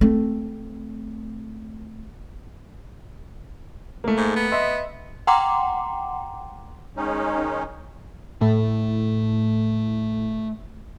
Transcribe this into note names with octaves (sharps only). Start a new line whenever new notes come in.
A3 C4
A3 A#3
G#2
B3
D#5 E5 C6
F#5 G5 A#5 C6 D6
D#3 G#3 C#4 D#4
A2 A3